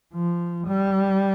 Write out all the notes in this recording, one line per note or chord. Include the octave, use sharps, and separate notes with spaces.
F3
G3